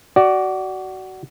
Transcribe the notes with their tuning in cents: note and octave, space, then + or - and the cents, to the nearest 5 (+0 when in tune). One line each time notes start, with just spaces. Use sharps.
F#4 +20 D5 +0